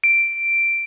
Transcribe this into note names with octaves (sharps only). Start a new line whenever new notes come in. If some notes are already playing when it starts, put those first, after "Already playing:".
D7